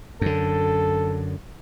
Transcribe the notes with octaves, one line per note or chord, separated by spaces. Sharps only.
F#2 D3 A4